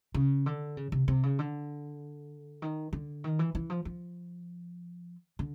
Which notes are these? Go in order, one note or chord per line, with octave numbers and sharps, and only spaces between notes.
C#3
D3
C#3
C3
C3
C#3
D3
D#3
D3
D#3
E3
E3
F3
F3
D3